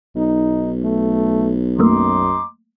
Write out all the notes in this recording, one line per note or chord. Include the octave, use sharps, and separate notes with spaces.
B1 D#4
A3
F#2 F#3 A3 A#3 D#4 C6 D6